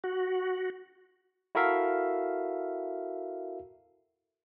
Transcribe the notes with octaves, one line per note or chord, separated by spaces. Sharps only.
F#4
E4 F#4 A4 A#4 E5 F5